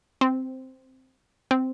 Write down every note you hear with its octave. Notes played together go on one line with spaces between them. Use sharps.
C4
C4